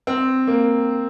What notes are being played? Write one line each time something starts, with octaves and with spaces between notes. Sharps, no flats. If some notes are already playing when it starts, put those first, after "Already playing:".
C4
A#3